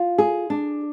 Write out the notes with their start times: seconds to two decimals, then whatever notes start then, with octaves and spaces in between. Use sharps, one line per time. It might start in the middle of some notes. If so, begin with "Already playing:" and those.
Already playing: F4
0.18 G#4
0.50 D4